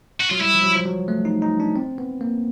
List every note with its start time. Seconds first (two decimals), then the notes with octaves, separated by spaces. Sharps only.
0.20 F#4
0.30 F#3 F4
0.40 G3 E4
0.55 F3
0.63 F#3
0.75 F3
0.86 F#3
1.08 A3
1.25 D#4
1.42 D#4
1.60 D4
1.76 C4
1.98 B3
2.21 A#3